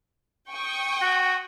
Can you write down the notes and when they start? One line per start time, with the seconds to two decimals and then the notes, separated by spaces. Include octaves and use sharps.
0.51 G5 C#6 D#6
1.02 F#4